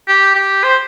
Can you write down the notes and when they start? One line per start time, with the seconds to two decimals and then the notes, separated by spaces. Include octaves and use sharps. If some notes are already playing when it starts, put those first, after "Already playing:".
0.08 G4
0.35 G4
0.64 C5